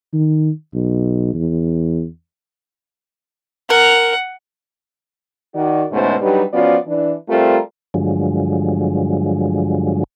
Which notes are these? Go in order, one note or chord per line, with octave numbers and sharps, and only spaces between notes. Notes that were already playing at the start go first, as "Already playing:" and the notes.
D#3
B1
E2
A#4 F#5
D#3 F#4 D5
D2 G#2 B2 A3 C#4 C5
F#3 G3 D4 D#4 G4 B4
F3 B3 C#4 F4 F#4 D5
E3 D4
G3 A3 C4 F4 G4 A#4
G2 D3 F3 F#3 G#3